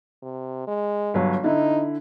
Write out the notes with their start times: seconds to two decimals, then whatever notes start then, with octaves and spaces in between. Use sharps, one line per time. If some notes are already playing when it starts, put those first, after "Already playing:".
0.22 C3
0.67 G#3
1.14 G1 F#3
1.44 D3 D#4 E4